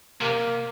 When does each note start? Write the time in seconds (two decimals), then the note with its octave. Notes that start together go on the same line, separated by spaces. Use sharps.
0.21 C3 A#3